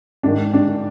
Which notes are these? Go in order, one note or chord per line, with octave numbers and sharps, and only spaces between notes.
G#2 D#3 D4
D4